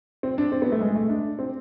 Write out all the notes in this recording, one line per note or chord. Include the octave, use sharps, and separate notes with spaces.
C4
D4
C4
B3
A3
G#3
A3
D4
C4